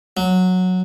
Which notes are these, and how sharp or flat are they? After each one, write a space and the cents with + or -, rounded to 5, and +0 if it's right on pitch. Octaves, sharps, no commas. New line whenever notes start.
F#3 -10